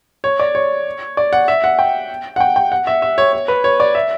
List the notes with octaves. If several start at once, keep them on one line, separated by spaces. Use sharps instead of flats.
C#5
D5
C#5
D5
F#5
E5
F#5
G5
F#5
G5
G5
F#5
E5
E5
C#5
C#5
B4
C#5
D5
E5